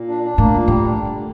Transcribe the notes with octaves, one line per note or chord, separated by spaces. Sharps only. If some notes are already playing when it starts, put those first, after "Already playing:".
Already playing: A#2
D4
D4
A2 A#3
A#2
A2 G3
D4
D3
D3